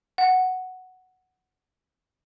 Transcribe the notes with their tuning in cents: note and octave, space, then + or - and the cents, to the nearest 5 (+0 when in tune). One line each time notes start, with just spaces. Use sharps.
F#5 +5